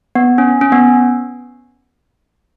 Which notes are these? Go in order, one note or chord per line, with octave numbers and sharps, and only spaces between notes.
B3
C#4
C#4
B3